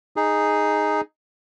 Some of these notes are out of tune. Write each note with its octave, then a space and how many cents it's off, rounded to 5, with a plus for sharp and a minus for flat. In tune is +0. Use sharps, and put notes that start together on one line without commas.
D#4 +0 G#4 +0